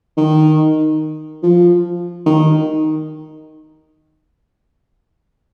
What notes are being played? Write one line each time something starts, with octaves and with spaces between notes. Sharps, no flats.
D#3
F3
D#3